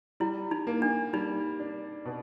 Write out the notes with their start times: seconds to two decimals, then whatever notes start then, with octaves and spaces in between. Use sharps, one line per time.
0.20 G3 E4
0.51 D#4
0.67 A#3
0.82 D4
1.13 G3 D#4
1.59 D4
2.05 B2